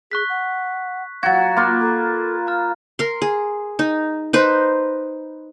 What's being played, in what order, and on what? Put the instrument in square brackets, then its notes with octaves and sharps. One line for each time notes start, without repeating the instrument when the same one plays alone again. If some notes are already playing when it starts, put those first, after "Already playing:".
[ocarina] G#4 [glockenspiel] C#6 F#6 B6
[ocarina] F#5
[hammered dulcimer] F#3 F#4 [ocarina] F5 [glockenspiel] G#6 A6
[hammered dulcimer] A#3 F4 [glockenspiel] B5 F#6
[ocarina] A4
[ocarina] F5 [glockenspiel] A#5 F6
[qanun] A#4 C6
G#4
D#4
D#4 B4 C5